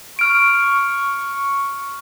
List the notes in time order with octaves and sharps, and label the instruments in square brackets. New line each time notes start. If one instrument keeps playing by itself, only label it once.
[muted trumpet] C#6 [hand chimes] F6 D7